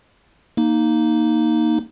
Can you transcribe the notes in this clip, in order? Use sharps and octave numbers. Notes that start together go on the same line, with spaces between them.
A#3 D#4